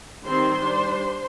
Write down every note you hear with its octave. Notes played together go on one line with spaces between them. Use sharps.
D#3 G3 C4 C5 C6
G3 D4